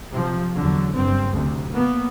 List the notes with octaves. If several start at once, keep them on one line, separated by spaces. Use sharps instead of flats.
C3 F3
E2 D3 F#3
F#1 G2 C4
D2 C3
A#3 B3